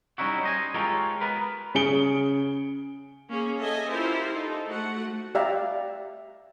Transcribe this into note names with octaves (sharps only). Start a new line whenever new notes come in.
G3 C#4 D#4 E4 F#4
C5 D#5 G#5
G#3 F4 G4 A4 A#4 C#5
B3 A#4 B4
C#3 G#4 C#7 D7 G7
A#3 C#4 G#4
A4 D#5 E5 G#5
E4 F4 G4 A#4 C5
D#4 A4
A3 F#4 F#5
G4 D5 E5 F5 A#5